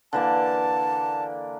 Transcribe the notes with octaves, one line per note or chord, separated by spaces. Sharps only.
D3 E3 A#3 A5